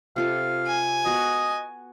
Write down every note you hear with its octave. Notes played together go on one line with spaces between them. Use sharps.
C3 F4 A4 F5
G#5
B3 F#4 D#5 B5